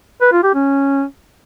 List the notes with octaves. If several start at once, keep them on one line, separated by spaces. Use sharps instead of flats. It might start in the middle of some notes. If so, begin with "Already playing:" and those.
B4
F4
G4
C#4